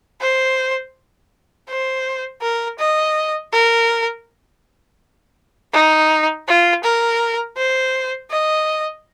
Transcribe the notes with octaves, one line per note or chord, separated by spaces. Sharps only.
C5
C5
A#4
D#5
A#4
D#4
F4
A#4
C5
D#5